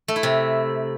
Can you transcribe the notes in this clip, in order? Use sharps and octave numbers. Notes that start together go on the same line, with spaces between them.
A3
E4
C3